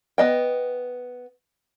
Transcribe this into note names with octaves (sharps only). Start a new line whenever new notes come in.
B3 D#5 G5